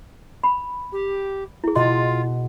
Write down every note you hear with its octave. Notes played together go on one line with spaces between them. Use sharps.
B5
G4
E4 G#4
B2 F4 D#5 C6